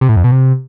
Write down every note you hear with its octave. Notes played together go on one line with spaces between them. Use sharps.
C3
A2
F2
B2
C3